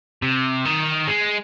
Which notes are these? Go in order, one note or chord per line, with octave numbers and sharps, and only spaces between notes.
C3
D#3
G#3